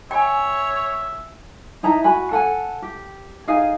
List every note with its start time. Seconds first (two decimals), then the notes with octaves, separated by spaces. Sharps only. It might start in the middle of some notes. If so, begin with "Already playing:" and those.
0.11 C#5 E5 G5 G#5
1.83 D#4 E4 A#5
2.04 F#4 G#5 B5
2.31 A4 F#5 G#5
2.82 G4
3.48 D#4 G#4 F5 G#5